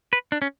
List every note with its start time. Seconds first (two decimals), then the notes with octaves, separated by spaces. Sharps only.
0.13 B4
0.32 D4
0.42 C#4